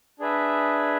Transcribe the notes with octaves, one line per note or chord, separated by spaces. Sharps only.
D4 G#4 B4 E5